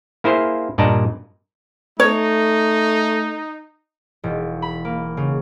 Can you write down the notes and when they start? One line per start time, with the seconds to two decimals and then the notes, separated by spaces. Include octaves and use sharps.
0.24 A#3 E4 G#4 C5 F5
0.78 G2 A#2 D5 D#5 A5 A#5
2.00 A3 D#4 C#5
4.24 E1
4.62 B5
4.85 A#3
5.17 C#3